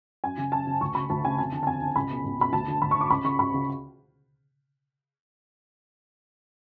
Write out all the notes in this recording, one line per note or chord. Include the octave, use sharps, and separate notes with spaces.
F#2 G#5
C#3
F#2 A5
C#3
D2 C#6
C#3 B5
D2 A5
C#3 G#5
F2 A5
D3
A5
F2 G#5
D3
C#2 B5
B2
C#2
B2 B5
D2 A5
D3
D2 B5
C#6
D3 D6
C#2 B5
C#3 C#6
C#2 B5
C#3